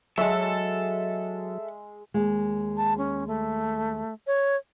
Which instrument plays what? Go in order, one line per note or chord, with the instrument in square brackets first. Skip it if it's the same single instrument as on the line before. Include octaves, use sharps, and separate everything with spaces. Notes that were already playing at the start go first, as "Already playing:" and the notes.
[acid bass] F#3 [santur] G#3 E6 [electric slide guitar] A4 A5 [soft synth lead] E5
[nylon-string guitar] D#2 G#3
[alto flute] A5
C#4
A3
C#5